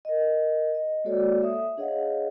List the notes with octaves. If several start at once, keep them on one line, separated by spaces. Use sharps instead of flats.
A#4 D#5
D#5
G#3 A#3 F#4 A4 C#5 D5
A4 E5 D#6
D4 G#4 C#5 D#5 F5 F#5